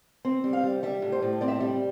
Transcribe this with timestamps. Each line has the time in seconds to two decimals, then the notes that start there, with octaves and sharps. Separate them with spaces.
0.25 C4
0.44 G3
0.53 F5
0.63 G3
0.83 G3 E5
1.02 A2
1.12 C5
1.22 A2
1.41 C4 D5
1.48 E5
1.56 G3 D5